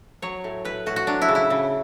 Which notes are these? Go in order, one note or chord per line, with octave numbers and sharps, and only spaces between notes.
F#3 C#5
A2
A2 B4
A2 F#4
F#4
F#3 D4
E4
C#3
E4
C#3